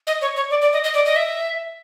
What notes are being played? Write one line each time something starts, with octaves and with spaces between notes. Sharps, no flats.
D#5
C#5
C#5
D5
D5
D#5
D#5
D5
D#5
E5